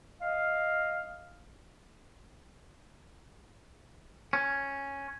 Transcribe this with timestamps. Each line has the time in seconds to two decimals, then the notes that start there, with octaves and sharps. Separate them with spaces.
0.22 D#5 F5
4.33 C#4